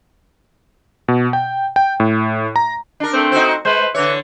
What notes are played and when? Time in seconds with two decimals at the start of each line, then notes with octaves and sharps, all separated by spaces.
1.08 B2
1.33 G5
1.76 G5
2.00 A2
2.56 A#5
3.00 D4 A#4
3.13 A3 C4
3.32 D#4 F#4 C5
3.65 G#3 B4 C5
3.95 D3 E3 C#5